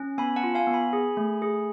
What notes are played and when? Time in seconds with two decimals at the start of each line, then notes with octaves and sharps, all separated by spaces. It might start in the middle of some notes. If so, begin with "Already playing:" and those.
Already playing: C#4
0.18 B3 G#5 B5
0.36 F#5 A5
0.43 F4
0.55 F5 G#5
0.67 B3
0.73 G#5 B5
0.93 G#4
1.17 A3
1.42 G#4